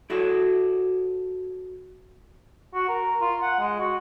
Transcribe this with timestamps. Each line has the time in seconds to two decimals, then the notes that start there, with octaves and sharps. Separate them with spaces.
0.10 E4 F#4 A4 C#5
2.74 F#4
2.89 A#4
3.21 F4
3.42 F#5
3.59 G#3
3.79 F#4